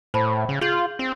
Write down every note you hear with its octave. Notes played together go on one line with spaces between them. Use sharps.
A2 C5 A5 B5
C#3
F4 G#4 G6 F#7
C4